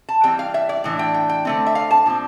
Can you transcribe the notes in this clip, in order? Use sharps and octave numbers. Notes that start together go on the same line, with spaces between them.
A5
E3 G3 C4 G5
F5
E5
D5
A2 E3 D4
G5
G5
G5
D3 A3 C4
E5
F5
A5
A#2 F3 C4